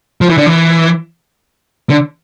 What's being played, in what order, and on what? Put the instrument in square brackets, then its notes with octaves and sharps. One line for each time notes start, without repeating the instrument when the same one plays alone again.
[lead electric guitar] F3
E3
D3
E3
D3